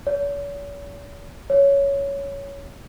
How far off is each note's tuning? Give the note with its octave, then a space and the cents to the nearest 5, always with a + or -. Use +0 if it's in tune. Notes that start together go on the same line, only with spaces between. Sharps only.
C#5 +45
C#5 +10